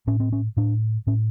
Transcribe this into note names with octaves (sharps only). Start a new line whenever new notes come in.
A2 C#4
C4
C#4
A2 D4
A2 C#4